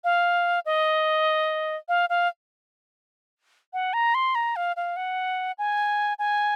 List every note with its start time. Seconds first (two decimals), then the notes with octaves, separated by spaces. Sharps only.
0.04 F5
0.66 D#5
1.89 F5
2.10 F5
3.73 F#5
3.93 A#5
4.15 C6
4.35 A#5
4.56 F5
4.76 F5
4.97 F#5
5.58 G#5
6.19 G#5